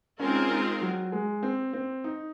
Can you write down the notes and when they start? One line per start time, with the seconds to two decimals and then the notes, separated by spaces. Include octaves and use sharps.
0.20 G#3 C4 C#4 F4 A#4
0.29 D#4
0.36 C#4
0.51 D#4
0.81 F#3
1.12 G#3
1.43 C4
1.73 C4
2.04 D#4